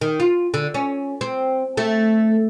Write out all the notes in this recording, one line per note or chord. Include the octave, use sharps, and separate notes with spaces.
D#3
F4
D3
C#4
C4
A3